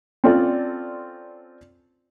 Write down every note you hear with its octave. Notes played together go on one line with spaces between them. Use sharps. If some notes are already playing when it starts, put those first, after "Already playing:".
C4 C#4 F4 A4 D5